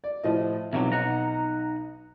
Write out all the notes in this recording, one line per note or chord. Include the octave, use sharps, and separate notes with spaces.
D5
A2 F3 D#5
B1 F2 C3 F#3
D#4 F#5 A#5